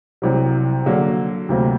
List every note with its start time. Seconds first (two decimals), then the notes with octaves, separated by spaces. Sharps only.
0.22 C2 C3 F#3
0.86 D3 F#3 A#3
1.49 D2 C3 F#3 A#3